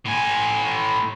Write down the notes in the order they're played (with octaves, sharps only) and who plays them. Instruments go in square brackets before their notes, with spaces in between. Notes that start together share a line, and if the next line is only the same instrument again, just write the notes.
[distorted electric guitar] A2 G#5